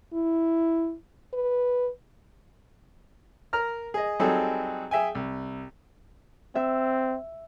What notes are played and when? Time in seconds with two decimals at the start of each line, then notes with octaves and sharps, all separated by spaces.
0.13 E4
1.34 B4
3.53 A#4 A#5 F6
3.94 G#4 D#5
4.19 F#3 G3 C4 D#4 G#4 A4
4.91 G#4 E5 G5 G#5
5.15 C2
6.55 C4 E5 E6